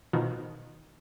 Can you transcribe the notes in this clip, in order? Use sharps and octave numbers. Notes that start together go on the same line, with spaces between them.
B2 D#3 F3